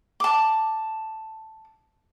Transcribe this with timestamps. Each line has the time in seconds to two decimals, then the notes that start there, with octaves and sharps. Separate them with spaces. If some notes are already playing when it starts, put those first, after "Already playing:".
0.20 A5 D6